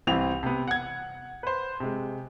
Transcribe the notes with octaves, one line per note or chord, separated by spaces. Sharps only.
C2 E3 C4 G4 F7
C3 B3
F#5 G#6
B4 C5
C3 G#3